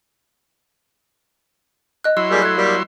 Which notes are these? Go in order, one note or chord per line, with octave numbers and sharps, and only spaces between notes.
D#5 F#6
F#3 E4 C6 E6
G3 A#3 G#4
A3 F#6 G#6
G3 A#3